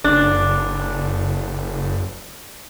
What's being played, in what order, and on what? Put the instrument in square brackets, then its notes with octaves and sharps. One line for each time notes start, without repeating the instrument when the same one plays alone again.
[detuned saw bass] F#1 [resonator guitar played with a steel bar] D4